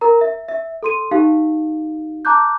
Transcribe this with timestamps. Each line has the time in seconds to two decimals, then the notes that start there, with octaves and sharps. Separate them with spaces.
0.01 A#4 A#5
0.21 E5
0.48 E5
0.83 A4 C6 D#7
1.11 D#4 G4 F5
2.25 A5 A#5 D6 F#6 G6